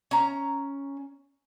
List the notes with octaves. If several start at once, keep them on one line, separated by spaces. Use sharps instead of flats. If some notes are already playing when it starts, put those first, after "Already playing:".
C#4 A#5